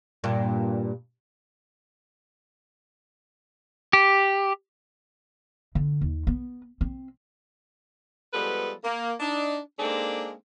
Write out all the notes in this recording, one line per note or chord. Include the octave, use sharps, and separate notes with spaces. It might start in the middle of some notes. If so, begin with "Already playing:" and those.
G2 A#2
G4
D3
D#2
B3
C4
F3 G3 G#3 B3 A4 B4
A#3
D4 D#4
G#3 A#3 C4 D4 D#4 A4